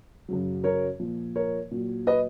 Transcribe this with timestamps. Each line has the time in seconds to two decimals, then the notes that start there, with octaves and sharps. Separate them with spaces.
0.28 F#2 C#3 F#3
0.64 A#4 C#5
1.00 A#2 F3
1.36 A#4 C#5
1.71 A#2 F#3
2.07 B4 D#5